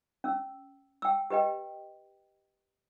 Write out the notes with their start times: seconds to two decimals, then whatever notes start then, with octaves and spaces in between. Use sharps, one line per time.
0.24 C#4 E6
1.02 G5 E6
1.30 G4 B4 D#5 G5